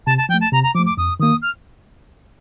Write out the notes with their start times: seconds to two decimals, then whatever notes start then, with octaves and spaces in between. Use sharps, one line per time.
0.06 C3 A5
0.18 A5
0.29 F3 G5
0.34 A3
0.41 A5
0.52 C3 A#5
0.63 A#5
0.74 F3 D6
0.79 A3
0.86 D6
0.97 F2 D#6
1.20 D#3 A#3 D#6
1.42 F6